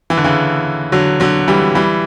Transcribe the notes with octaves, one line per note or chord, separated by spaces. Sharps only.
E3
D3
C#3 E3
D3 F#3
D3 F#3
E3 G3
E3 G3